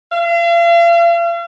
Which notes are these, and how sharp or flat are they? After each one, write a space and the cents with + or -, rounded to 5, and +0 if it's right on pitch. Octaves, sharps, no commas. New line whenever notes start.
F5 -40